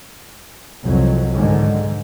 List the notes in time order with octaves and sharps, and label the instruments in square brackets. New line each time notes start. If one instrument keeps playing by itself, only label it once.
[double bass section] C2 F2 F#3
G#2 D3 D#3 G#3